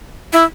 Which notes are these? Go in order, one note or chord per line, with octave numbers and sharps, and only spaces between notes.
E4